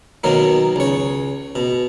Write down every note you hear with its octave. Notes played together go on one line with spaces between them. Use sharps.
B2 D#3 F#3 A#3
C#2 C#5
B2